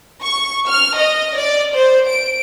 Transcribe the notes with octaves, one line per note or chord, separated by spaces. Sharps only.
C#6
F6
D#5
D5
C5
D7